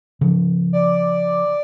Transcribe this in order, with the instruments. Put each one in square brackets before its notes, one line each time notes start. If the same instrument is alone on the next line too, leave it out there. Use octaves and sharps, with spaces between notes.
[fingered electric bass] C#3 F3
[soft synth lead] D5